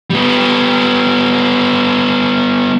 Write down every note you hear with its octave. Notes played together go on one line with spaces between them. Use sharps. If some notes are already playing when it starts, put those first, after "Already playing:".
G3 B3